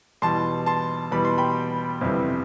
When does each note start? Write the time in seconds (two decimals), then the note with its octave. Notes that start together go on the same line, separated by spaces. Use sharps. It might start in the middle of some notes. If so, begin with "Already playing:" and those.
0.22 E2 B2 G3 A5 C6
0.66 A5 C6
1.11 E2 B2 G3 B5
1.25 C6
1.38 G5 B5
2.01 G1 F2 C3 E3 G3